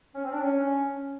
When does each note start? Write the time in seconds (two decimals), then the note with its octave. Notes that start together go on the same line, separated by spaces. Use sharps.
0.15 C#4
0.24 C4
0.32 D4
0.41 C#4